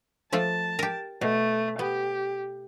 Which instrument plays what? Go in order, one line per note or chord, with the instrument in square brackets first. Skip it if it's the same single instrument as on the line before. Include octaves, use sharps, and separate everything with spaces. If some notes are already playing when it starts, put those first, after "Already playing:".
[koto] F3 A3 F4 [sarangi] A5
[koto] G4 A#4
[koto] B2 [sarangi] A3
[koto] B3 [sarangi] G4